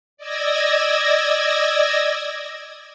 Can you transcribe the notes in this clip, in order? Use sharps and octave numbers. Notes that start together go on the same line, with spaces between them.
D5 D#5 E6 G#6 A#6